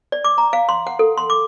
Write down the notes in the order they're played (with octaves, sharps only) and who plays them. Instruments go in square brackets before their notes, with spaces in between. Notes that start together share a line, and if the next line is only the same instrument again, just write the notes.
[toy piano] D5
D6
A#5
F5
C6
F#5
A4
C6
D6